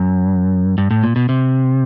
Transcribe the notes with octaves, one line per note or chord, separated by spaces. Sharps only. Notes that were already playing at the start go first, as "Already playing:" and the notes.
Already playing: F#2
G2
A2
A#2
B2
C3